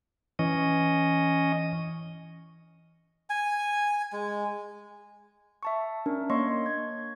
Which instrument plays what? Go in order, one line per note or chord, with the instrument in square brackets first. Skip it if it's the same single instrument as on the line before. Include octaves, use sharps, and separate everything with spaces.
[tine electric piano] E3 [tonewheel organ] C#4 D#5
[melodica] G#5
G#3
[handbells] E5 A5 C#6
C#4 D4 A#4
A#3 D4 C#5 D#5 C6 C#6
G#6